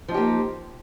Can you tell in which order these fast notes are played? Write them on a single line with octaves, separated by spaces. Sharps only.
F3 D#4 G4 A#3